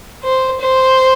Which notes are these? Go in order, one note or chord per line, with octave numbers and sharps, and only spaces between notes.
C5
C5